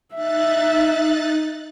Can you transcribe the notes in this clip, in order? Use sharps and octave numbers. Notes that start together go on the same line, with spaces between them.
D#4 E5 F#6 A6